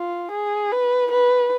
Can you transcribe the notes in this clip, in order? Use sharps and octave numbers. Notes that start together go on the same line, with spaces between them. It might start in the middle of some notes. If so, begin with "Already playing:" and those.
Already playing: F4
G#4
B4
B4